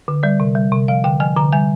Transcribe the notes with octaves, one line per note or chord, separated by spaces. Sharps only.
D3
G3 D5
C3
G3
C3
F3 F5
D3 G5
F3 G#5
D3 A#5
G3 G#5